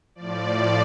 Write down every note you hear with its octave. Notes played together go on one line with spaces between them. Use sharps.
A2 F3 D5